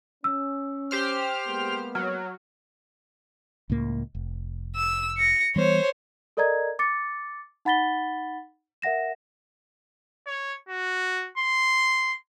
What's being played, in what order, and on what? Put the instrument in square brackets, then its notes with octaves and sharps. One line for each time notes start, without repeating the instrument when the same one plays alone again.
[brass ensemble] C#4 [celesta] E6
[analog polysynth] G4 C5 F6
[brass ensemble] G#3 A#3 B3
[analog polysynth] F#3 [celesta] F6
[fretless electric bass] C#2 A2 A#3
F1
[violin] E6
A#6 C#7
[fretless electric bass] E3 G3 B3 [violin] C5 C#5
[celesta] A4 A#4 D5 D#5 A#5 G#6
D6 A6 C#7
D#4 F#5 B5 A6 B6 G7
A#4 E5 F#5 A#6 E7
[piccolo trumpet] C#5
F#4
C6